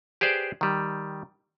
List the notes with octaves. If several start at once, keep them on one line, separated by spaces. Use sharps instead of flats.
G4 G#4 B4 C5 D5
D#3 G3